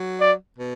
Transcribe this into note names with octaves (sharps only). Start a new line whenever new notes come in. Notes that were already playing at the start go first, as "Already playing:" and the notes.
Already playing: F#3
D5
B2